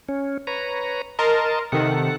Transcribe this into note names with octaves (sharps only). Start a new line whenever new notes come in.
C#4
B4 C#5 A#5
A#4 D#5 A5 C6
C3 D#3 A4 F#5